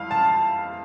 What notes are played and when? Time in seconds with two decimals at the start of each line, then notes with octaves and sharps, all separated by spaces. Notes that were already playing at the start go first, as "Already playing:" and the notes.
Already playing: F2 E3 G3 F5
0.11 A5